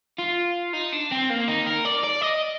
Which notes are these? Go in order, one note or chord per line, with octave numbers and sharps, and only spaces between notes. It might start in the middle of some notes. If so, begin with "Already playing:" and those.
F4
D#4
D4
C4
A#3
D#4
A#4
D5
D5
D#5